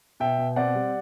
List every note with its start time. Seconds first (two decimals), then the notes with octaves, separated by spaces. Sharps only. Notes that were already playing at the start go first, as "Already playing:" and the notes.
0.20 B2 E5 G5
0.39 B2
0.56 C4 D5 F#5
0.75 G3